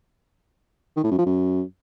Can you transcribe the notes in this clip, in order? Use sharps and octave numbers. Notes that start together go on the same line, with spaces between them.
D#3
A2
F#2
F3
F#2